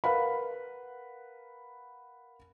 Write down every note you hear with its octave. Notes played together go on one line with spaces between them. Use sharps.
A#4 B4 F5 F#5 B5